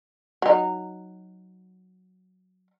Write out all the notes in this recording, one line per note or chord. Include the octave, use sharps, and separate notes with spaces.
F#3 D#4